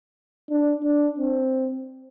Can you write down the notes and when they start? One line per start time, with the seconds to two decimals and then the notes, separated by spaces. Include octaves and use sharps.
0.50 D4
0.85 D4
1.19 C4